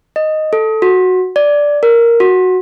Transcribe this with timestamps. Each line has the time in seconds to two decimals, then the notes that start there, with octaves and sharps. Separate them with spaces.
0.16 D#5
0.53 A4
0.82 F#4
1.36 D5
1.83 A#4
2.20 F#4